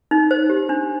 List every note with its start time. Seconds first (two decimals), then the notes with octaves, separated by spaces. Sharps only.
0.11 D#4
0.31 C5
0.50 G4
0.69 D4